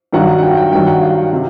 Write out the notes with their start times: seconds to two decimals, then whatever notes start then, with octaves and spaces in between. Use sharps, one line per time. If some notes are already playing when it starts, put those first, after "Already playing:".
0.13 G2 D#3 F#3 F#5
0.38 F#5
0.42 G5
0.57 G5
0.72 G2 D#3 F#3 G5
0.86 F#5
1.02 F5
1.33 C3